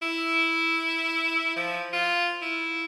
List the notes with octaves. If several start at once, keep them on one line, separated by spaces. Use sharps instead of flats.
E4
F3
F4
E4